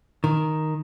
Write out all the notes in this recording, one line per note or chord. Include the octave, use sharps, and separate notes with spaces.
D#3